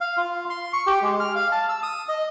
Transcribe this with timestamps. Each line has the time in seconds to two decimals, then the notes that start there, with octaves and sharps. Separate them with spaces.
0.01 F5
0.17 F4
0.50 C6
0.73 C#6
0.87 G4
1.02 G#3
1.20 F6
1.35 F5
1.52 A5
1.69 E6
1.83 D#6
2.09 D#5